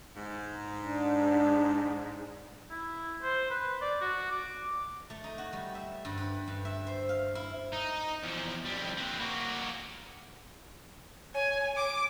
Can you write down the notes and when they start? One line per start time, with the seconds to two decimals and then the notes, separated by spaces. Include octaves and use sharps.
0.17 G#2
0.83 D4
2.71 E4
3.23 C5
3.51 B4
3.82 D5
4.01 F#4
4.31 D6
5.10 A3
5.24 D#4
5.38 F#4
5.53 G3
5.75 E5
6.05 G2
6.18 B4
6.48 G2
6.65 E5
6.87 C5
7.09 F5
7.35 E4
7.73 D#4
8.23 E2 F3
8.65 F2 G3
8.97 C4 B4
9.20 A#3 F#4
11.34 C#5 G#5
11.77 D6